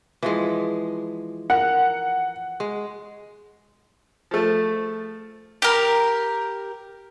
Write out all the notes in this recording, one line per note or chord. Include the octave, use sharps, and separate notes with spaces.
E3 F3 G#3
A#4 F#5
G#3
F3 A3
G4 A#4